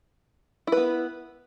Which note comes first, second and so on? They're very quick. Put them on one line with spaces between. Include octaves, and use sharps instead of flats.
E4 B4 B3